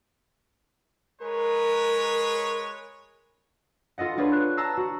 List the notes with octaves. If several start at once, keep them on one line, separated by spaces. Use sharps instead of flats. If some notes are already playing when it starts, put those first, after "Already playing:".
G#3 A#4 B4 C#5
F4 A4 D#5 F#5
D4 F4 G#4 B4 C#5
F#6
A5 A#5 E6 C7
F#4